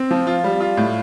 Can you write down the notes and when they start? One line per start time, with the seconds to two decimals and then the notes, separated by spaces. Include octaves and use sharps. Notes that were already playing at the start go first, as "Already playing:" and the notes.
Already playing: C4
0.11 F3
0.27 F4
0.44 G3
0.60 F4
0.77 A2